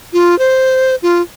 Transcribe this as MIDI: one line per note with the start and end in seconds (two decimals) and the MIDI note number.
0.13 0.38 65
0.39 0.95 72
1.02 1.22 65